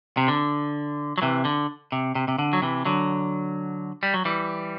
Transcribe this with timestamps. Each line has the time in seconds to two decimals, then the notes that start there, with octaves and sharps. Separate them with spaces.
0.17 C3
0.28 D3
1.18 F#3
1.22 C3 E3
1.45 D3
1.92 C3
2.15 C3
2.28 C3
2.39 D3
2.53 F#3
2.62 C3 E3
2.85 D3 F#3
4.03 G3
4.14 F#3
4.25 E3 G3